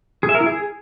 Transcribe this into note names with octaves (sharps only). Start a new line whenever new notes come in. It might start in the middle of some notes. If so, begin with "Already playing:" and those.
G#4
E5
A#4
E4
G#4